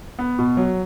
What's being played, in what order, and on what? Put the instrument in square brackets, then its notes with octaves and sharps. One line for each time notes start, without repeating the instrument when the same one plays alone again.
[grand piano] B3
B2
F#3